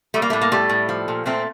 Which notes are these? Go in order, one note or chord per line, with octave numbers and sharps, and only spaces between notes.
G3 A3
A#3
A2 A3
A#3
G3 A3
A2
F3
A#2
A#2 A3 C4